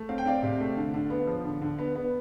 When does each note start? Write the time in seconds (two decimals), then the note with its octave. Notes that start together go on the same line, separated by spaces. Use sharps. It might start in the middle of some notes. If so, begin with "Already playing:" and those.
Already playing: A3
0.09 C4 F5
0.18 G5
0.25 C4 D5 F5
0.43 C3
0.60 A3
0.76 D3
0.94 D3
1.10 B3
1.27 F3
1.45 D3
1.62 D3
1.79 B3
1.95 B3